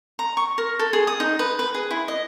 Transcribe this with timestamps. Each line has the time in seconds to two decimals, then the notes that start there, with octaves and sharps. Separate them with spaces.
0.19 A#5
0.37 C#6
0.58 A#4
0.79 A4
0.93 G#4
1.07 D#6
1.20 D#4
1.39 B4
1.59 B4
1.74 G#4
1.91 E4
2.08 D#5